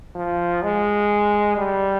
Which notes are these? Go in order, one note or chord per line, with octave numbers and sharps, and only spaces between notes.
F3
G#3
G3